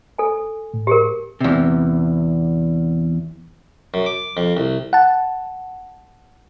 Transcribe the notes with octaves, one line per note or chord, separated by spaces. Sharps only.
A4 G#5
A2
G4 G#4 A#4
E2 C3
F#2
D6
F2
C2
F#5 A5